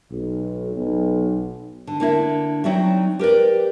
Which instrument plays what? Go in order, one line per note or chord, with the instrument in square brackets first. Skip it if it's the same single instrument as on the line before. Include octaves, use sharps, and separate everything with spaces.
[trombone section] B1
B1
[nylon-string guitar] D3
D3 A#3 E4
F#3 C4 D#4 F#4 D5 E5
G4 A#4 B4 D5